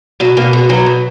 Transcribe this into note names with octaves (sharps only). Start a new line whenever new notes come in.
B2 F#3
B2 A#3
B2 G#3
B2 F#3
B2